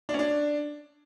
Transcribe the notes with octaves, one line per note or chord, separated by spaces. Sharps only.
D4
C#4
D4